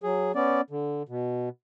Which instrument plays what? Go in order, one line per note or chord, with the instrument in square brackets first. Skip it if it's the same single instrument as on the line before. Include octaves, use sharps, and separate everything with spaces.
[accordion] F#3 G#4
B3 C#4 D5
D3
B2